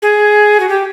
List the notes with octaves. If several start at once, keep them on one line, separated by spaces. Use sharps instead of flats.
G#4
F#4
G4